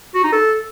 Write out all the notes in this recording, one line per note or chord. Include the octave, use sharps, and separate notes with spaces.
F#4
D#4
A4